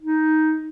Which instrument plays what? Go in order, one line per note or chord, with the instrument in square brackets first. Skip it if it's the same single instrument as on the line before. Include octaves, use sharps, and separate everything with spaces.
[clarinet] D#4